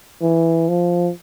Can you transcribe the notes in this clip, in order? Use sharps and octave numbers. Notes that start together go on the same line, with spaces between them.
E3
F3